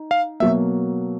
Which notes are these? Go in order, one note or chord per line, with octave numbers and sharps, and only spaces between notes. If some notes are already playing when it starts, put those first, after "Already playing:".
Already playing: D#4
F5
B2 F#3 A#3 E5